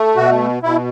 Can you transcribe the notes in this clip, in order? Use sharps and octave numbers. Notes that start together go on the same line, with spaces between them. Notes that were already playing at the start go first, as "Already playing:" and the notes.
Already playing: A3
B2 F#4
B2 E4